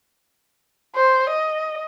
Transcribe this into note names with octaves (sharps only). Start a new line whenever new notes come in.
C5
D#5